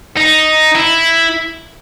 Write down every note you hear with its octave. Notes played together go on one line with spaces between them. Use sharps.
D#4
E4